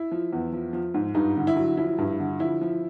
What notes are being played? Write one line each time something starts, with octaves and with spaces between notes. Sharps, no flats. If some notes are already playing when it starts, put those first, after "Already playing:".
Already playing: E4
F3
E2
F3
F3
G#2
G2 D#4
D3
E4
F#3
F3 E4
G2
D3
F3 E4
F3